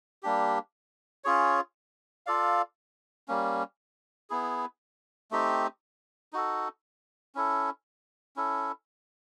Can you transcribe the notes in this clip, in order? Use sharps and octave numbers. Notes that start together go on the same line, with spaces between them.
G3 A#3 D4 G4
C#4 F4 G#4 C#5
F4 A4 D5 F5
G3 A#3 C#4
B3 E4 G#4
A3 C4 D#4 G4
D#4 F#4 A4
C#4 E4 A4
C#4 E4 A4